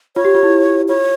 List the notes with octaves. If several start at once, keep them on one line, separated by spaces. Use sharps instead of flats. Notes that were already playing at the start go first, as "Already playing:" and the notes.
F4 C#5
G4
F4
E4
F4 C#5